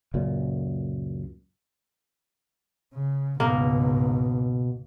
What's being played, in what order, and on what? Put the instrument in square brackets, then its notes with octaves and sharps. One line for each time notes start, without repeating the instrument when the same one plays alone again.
[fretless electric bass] C#2 F#2 A#2
[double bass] C#3
[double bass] C#2 G#2 [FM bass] B2 [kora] A#3